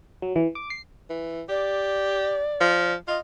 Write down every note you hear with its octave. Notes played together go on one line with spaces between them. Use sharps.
F#3
E3
D6
C7
E3
G4 D5
F3
F4 D#5